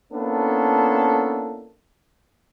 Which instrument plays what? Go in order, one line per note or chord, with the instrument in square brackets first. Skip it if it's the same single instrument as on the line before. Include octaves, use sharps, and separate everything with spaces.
[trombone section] A#3 B3 C#4 D4 E4 A4